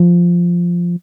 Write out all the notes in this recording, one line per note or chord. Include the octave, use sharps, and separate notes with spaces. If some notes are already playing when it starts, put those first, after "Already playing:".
Already playing: F3